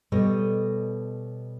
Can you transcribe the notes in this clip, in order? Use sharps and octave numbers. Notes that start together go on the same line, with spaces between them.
B2 G3 A4 C#5 D#5